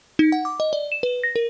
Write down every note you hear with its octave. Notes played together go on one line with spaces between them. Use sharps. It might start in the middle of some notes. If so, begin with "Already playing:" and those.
D#4
F#5
D6
D#5
D5
E7
B4
A#6
A#4